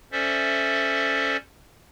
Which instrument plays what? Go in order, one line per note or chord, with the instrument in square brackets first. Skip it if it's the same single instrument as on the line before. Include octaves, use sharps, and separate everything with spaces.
[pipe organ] C#4 A4 C5 D5 E5